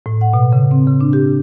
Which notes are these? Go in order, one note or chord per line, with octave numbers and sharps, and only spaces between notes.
A2
F#5
B2
C#3
C4
C#3
D4
G4